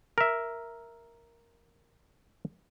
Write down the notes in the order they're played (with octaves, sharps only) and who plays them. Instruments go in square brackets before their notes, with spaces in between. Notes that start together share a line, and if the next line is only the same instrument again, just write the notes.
[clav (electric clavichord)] A#4 E5